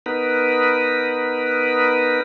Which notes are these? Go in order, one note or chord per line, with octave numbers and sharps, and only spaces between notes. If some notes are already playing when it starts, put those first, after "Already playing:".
B3 D#4 A#4 B4